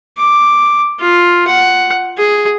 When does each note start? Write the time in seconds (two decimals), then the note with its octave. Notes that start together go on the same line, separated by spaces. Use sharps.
0.18 D6
1.00 F4
1.47 F#5
2.18 G#4